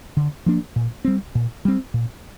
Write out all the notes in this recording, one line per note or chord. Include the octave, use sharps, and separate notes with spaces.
D3
F3 A#3 D4
A#2
G3 C4
A#2
G3 C4
A#2